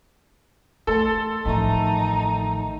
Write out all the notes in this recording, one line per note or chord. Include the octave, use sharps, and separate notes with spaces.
A3 A4 C6
A1 D#3 F3 A3 D#4